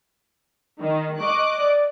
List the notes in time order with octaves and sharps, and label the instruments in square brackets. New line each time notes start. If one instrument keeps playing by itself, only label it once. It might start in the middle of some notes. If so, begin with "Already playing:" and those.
[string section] D#3
[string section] D#5 D6 F#6 [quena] C#6
[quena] D5